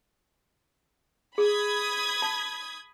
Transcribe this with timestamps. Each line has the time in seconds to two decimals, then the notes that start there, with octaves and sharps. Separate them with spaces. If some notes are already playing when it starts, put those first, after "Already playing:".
1.38 G#4 B5 D#6 G#6
2.22 A5